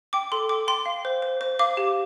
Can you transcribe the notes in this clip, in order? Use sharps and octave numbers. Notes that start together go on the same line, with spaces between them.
G5 D6
A4 C6
G5 D6
G5 C6
F5
C5
C5
C5
F5 D6
G4